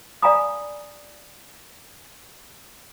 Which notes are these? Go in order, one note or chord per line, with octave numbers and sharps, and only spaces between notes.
D5 F5 G#5 A#5 B5 D#6